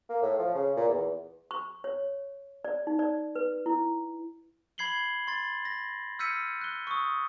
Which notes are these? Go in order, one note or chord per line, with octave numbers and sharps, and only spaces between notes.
A#3
A2
F3
C#3
A#2
E2
C#6
C#5
D5
D#4
D5
B4
E4
B5 G#6 C7 F#7 G7
C6 A6
A#6
E6 F6 G6 B6 C#7 D#7
F#6 G7
C#6 D#6